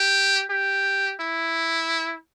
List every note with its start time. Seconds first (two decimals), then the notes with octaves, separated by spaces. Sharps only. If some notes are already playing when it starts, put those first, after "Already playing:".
Already playing: G4
0.50 G4
1.20 E4